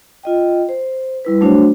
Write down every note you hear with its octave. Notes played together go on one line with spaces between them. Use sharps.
F4 D#5 G5
C5
G3 E4 B4
F#3 A3 D4 F#4 C5 C#5